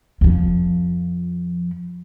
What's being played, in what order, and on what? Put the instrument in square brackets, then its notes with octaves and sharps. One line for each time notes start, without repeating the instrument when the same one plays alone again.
[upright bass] F2 F3